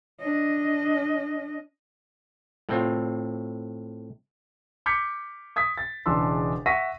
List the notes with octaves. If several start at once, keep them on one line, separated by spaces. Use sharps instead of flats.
D4 D#5
A2 C4 F4
D6 F6 G6 G#6 B6 C#7
D#6 G#6 B6
A6
E1 C#3 E3 D4 C6 E6
E5 F#5 C#6 A#6 B6 D#7